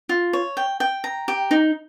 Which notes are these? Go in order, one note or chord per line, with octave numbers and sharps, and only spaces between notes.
F4
C#5
G5
G5
A#5
G4
D#4